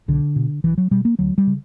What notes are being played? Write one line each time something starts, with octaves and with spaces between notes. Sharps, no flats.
B1 D3
B2
B1 E3
F#3
B2 G3
A#3
D2 F#3
G3
C#3